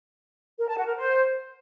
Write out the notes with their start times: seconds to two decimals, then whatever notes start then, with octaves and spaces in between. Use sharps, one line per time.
0.58 A#4
0.67 A5
0.76 F#4
0.86 A#4
0.95 C5